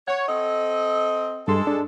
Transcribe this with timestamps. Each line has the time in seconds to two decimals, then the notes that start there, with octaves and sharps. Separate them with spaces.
0.08 C#5 F#5
0.28 C4 A4 D#5
1.48 G2 G#3 A4 C6
1.67 D4